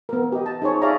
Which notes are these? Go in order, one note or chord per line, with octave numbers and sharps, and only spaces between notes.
B3 A#4
G4 D#5
A5
D#4 G#4 C5 C#5
G#4 C#5 D5 E5 F5 A#5